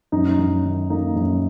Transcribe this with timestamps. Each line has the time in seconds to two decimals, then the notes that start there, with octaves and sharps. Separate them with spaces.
0.12 F#2 D#4
0.39 F#2
0.64 D#3
0.90 A#3 D#4
1.16 F#2